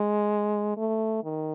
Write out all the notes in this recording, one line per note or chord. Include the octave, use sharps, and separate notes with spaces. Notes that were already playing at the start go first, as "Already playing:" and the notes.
Already playing: G#3
A3
D#3